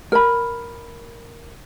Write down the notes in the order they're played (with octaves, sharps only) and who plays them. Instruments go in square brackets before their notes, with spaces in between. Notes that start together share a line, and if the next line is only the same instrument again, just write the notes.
[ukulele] A#4 B5